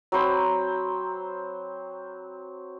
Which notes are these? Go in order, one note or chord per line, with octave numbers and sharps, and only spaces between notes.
F#3 C4 C5 B5